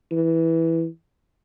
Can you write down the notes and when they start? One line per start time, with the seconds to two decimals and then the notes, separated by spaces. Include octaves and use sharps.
0.11 E3